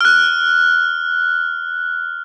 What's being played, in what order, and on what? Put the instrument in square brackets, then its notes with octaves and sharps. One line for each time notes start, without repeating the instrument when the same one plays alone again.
[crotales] F6 F#6